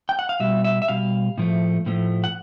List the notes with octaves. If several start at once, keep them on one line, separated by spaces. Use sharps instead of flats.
G5
F#5
F5
B2 G3 E5
E5
E5
B2 G3 F5
A2 F3 A3
A2 F3 A3
F#5